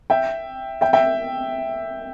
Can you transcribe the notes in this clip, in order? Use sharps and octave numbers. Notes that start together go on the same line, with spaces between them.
E5 G5
E5 G5
E5 G5